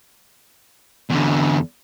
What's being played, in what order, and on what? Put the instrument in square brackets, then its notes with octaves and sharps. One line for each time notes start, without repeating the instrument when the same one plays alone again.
[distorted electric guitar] E2 D3